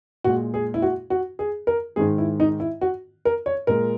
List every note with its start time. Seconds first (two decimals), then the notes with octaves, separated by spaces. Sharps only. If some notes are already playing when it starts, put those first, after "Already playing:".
0.24 A#2 G#3 F#4
0.54 G#4
0.74 E4
0.82 F#4
1.10 F#4
1.39 G#4
1.67 A#4
1.96 G#2 D#3 G#3 G#4
2.18 E4
2.40 D#4
2.60 E4
2.81 F#4
3.25 A#4
3.46 C#5
3.67 A#2 G#3 A#4